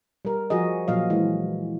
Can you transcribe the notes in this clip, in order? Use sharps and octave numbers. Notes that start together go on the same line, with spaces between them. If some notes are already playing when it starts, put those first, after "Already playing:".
G3 A#4
F3 F#4 G#4 D#5
A#2 F3 F#3 D#5 F5
E3 G#3